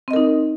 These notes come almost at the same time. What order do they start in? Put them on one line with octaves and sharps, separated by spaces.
C4 D#5 A#4 D#4